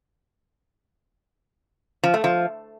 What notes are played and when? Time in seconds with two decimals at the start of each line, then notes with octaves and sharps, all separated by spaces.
2.04 F3
2.14 A3
2.24 F3